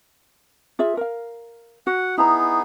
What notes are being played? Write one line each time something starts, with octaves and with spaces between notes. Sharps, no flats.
F4 G#4 E5
A#4 F5
F#4 F#5
B3 D#4 E4 G#4 A#5